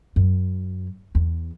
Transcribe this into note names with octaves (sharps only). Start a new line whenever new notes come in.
F#2
E2